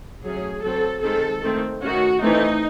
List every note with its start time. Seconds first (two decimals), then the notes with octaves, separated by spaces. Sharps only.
0.24 F#3 A3 C#4 G#4
0.64 F#3 C4 A4
1.03 D#3 G#3 C4 A4
1.43 D#3 A3 C4
1.82 D#3 A3 C#4 F#4
2.22 E3 A3 C4 D#4